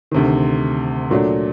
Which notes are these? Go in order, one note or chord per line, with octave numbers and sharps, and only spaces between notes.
D2 C3 D#3
A#2 F#3 A3 D4